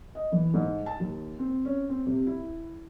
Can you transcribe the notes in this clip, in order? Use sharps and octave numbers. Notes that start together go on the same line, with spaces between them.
D#5
E3
G#2
A5
D#2
C4
C#4
C4
C3
E4